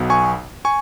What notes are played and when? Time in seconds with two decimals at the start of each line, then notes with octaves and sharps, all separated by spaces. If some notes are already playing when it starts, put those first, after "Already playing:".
Already playing: B1 B2 B3
0.10 G#5 C#6
0.65 G#5 C#6